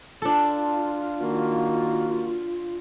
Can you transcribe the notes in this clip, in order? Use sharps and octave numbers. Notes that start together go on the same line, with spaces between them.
D4 F4 A4
D#3 A#3 F#4